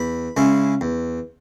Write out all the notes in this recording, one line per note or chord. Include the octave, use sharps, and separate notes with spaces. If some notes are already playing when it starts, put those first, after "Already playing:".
Already playing: E2 B5
C#3 G#3 C#4 E4
E2